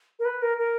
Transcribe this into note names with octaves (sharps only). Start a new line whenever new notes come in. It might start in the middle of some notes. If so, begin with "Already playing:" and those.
A#4
B4
A#4
A#4